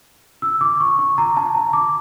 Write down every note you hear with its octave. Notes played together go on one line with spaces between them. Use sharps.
E6
D6
C#6
C#6
A#5
A5
A#5
D6